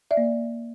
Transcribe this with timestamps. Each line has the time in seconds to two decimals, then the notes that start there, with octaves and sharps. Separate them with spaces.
0.11 D5 E5
0.17 A#3